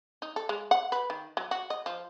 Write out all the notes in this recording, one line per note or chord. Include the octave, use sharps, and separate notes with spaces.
D#4
A4
G#3
F#5
B4
D#3
F#3
F#4
D#5
F3